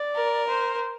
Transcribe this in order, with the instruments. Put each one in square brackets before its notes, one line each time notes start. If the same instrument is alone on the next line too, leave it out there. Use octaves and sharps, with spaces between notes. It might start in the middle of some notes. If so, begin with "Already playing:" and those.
Already playing: [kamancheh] D5
[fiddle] A#4
[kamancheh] C5